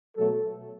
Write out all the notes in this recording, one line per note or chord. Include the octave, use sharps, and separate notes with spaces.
B2 F#3 A3 A4